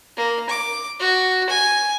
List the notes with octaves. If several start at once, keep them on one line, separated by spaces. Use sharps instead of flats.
A#3
D6
F#4
G#5